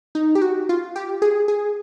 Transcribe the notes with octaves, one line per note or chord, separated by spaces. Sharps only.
D#4
G4
F#4
F4
G4
G#4
G#4